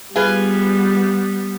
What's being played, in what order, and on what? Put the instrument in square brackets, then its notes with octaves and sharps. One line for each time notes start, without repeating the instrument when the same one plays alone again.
[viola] G3 B3 [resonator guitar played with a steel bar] F4 G#4 B4